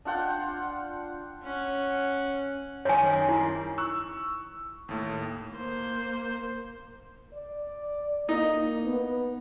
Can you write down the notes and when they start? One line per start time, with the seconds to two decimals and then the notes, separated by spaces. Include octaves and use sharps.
0.05 D4 F4 F#5 G5
1.42 C#4 F#5
2.85 F#2 D#3 C#5 G#5
3.29 E4
3.78 C#6 E6 F#6
4.89 D#2 A2
5.52 A#3 C5
7.33 D5
8.29 A#3 D#4
8.84 B3